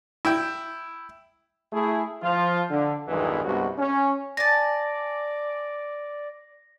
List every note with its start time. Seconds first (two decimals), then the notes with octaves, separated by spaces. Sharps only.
0.25 E4 G5
1.73 A3 E4 G#4
2.22 F3 F4
2.70 D3
3.08 B1 E2 G2 D#3 E3 G#3
3.44 C2 G2 G#3 B3 F#4
3.78 C#4
4.37 D5 G#5 A5 A#6